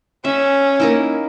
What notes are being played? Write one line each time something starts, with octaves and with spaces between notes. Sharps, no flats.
C#4 E5
A#3 D#4 E4